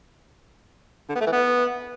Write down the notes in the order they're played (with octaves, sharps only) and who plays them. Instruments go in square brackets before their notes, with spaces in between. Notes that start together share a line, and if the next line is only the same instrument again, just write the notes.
[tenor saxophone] D3
B3
A3
E3
B3